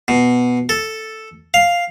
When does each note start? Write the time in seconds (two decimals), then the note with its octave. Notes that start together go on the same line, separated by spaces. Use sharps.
0.08 B2
0.69 A4
1.54 F5